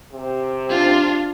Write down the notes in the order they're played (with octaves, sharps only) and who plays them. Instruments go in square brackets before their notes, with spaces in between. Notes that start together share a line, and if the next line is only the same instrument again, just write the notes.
[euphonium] C3
[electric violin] D4 F4